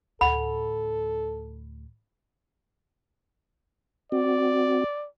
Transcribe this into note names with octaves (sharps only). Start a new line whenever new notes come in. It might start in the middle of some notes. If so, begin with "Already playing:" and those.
D2 A2 A4 F#5 B5
C4 F#4 D5